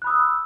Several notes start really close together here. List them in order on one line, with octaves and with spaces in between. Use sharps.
F#6 B5 D#6 E6